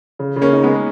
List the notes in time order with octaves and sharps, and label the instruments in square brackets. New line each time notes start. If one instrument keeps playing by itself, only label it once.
[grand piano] C#3
C#3
[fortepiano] A#3 C#4
[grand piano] D#4
[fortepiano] G#3 B3